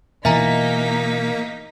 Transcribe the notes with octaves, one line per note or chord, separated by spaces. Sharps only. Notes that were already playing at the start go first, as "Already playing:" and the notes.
B2 E3 A#3 D#4 E5 G#5 A#5 B6